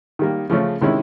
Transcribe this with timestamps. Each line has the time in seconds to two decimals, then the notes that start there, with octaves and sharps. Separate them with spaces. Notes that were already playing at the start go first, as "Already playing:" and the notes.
0.19 D#3 G3 A#3
0.50 C#3 F3 A3 C#4
0.81 C3 D#3 G#3 C#4 E4